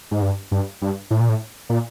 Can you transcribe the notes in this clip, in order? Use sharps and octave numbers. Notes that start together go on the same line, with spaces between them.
G#2
G2
G2
G2
A2
A#2
A2
A#2